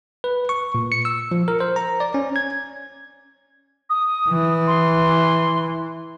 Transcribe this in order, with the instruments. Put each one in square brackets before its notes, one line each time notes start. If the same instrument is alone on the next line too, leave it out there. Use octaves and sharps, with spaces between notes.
[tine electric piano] B4
C#6
A#2
C#7
E6
F3
A#4
C5
A#5
D5
C#4
G#6
[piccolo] D#6
[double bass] E3
[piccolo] C6